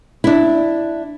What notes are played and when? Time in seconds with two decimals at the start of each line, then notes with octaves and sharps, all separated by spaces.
0.24 D4 E4